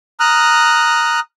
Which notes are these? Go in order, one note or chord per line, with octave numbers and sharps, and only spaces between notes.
A#5 D#6 F6 F#6